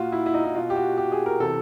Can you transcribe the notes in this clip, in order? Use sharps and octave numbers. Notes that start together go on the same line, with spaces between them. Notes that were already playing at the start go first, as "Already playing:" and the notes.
Already playing: A#2 F4 F#4
E4
E4
D#4
E4
B2 F4
G4
F#4
G4
G#4
A#4
C3 E3 A4